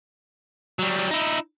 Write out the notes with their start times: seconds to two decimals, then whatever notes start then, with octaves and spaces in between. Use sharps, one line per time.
0.79 F#3 G3
1.11 D#4 E4